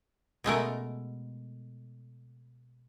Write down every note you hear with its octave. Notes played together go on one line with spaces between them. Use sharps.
B2 G#3 A3 A#4